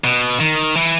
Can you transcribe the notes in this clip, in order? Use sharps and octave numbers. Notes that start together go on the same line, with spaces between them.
B2
D#3
E3